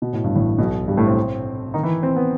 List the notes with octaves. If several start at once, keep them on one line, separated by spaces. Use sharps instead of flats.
B2
A2
G2
A1 A2
B1 B2
G2 G3
A2 A3
C3 C4
D#3 D#4
E3 E4
C4
B3